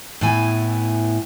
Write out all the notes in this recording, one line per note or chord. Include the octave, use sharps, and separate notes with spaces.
A2 B3 E4 G#5